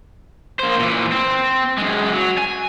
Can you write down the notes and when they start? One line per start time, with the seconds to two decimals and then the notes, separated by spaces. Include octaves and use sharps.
0.59 A#3 C5
0.79 A#2 E3
1.12 C4
1.78 F#2 G#3
2.13 F#3
2.38 G#5